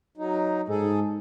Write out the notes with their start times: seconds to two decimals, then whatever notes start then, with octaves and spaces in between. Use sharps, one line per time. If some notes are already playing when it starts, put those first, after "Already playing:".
0.18 F#3 D#4
0.69 G#2 G#4 A4